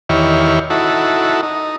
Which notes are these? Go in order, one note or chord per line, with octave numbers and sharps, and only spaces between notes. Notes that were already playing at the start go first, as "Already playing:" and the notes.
E2 D#3 E4 G4 C#5 F6
D#4 E4 F#4 A4
D#4